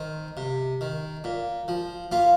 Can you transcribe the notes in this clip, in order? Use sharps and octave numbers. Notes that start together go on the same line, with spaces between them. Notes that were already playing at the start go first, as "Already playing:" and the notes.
Already playing: D#3 C4
C3
D#3
A#2
F3
A#2 F4